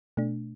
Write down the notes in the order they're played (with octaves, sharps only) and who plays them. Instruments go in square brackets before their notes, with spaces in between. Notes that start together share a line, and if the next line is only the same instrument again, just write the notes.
[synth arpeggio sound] B2 A3 D4